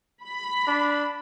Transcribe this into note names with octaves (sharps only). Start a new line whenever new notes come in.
B5
D4